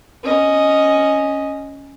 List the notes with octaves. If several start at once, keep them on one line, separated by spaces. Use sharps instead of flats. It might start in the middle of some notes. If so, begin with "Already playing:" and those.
C#4 D#5